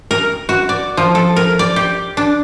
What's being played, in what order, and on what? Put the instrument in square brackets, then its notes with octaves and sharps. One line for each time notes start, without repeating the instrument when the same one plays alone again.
[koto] A#4
F#4
D5
F3
A4
A#4
D5
G4
D4